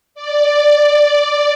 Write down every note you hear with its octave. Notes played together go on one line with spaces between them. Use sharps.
D5